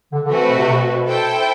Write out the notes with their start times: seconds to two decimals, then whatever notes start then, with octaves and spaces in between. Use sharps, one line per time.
0.12 D3
0.25 D3
0.31 E3 A3 C4 F#4 B4
0.49 B2
0.59 C3
0.68 B2
1.06 E4 A4 C5 G5